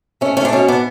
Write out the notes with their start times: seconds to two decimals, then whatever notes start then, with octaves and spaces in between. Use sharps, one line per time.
0.21 A3 C#4
0.37 A3 C#4
0.45 D4
0.53 B2 C#4
0.68 B3 D4